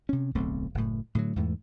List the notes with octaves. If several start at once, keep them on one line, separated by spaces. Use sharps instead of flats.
C3 C#4
D1 B1 A3 C4
F#1 F#2 A2
A2 D3 E3 F#3
E2 G#2 E3 A3